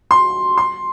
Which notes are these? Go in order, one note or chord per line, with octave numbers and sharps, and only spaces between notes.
C6
C6